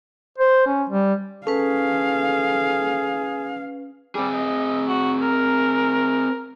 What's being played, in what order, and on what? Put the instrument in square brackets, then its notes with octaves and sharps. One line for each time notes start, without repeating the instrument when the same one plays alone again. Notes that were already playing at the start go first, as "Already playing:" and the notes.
[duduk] C5
C#4
G3
[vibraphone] C#4 B4 [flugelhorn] G#4 [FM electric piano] A4 [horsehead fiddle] F5
[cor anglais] G3 [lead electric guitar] C4 G#4
[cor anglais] D#5
F#4
A#4